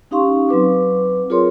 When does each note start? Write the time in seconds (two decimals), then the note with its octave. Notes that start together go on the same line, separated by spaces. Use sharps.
0.11 C#4 D#4 G4 F5 C6 C#6
0.49 F#3 C4 B4 D6
1.30 F4 G#4 A#4 C#5 C6